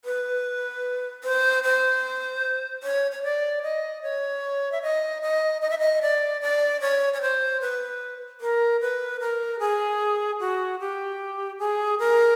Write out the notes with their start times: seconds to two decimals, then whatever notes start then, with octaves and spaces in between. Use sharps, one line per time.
0.05 B4
1.24 C5
1.64 C5
2.83 C#5
3.12 C#5
3.23 D5
3.63 D#5
4.02 C#5
4.72 E5
4.82 D#5
5.22 D#5
5.62 D#5
5.70 E5
5.79 D#5
6.02 D5
6.41 D5
6.81 C#5
7.14 C#5
7.22 C5
7.61 B4
8.41 A#4
8.81 B4
9.20 A#4
9.60 G#4
10.40 F#4
10.80 G4
11.59 G#4
11.99 A#4